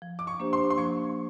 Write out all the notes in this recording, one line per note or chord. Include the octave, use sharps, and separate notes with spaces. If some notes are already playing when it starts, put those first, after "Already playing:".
F3
D6
C#6
A#3 D4 G4 C5
C6
C6
F3 C#6